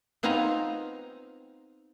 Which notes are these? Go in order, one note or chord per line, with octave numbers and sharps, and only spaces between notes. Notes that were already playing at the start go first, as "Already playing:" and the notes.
B3 C4 D#4 F4 G#5 A#5